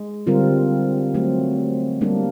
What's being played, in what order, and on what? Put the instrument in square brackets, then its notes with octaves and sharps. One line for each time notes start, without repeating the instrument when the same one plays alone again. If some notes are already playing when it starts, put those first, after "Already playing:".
Already playing: [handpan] G#3
D3 G3 C4 F4 A#4
F#3 A3 C4
G3 A#3 D4